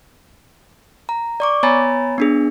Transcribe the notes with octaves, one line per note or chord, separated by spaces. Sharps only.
A#5
D5 C#6 D6
B3 C#5 G#5 A#5 B5 A6
B3 D4 G#4